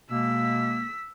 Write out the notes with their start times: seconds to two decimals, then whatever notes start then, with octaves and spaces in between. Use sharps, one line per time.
0.10 B2 G#3 A#3 E6 B6